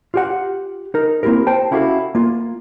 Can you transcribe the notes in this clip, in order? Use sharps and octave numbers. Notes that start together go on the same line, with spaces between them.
F4 G4 F#5
D#4 A#4
A#3 C4 E4 G4 A#4
C5 G5 A5
C#4 E4 F#4 G4 A4 F5
A#3 F4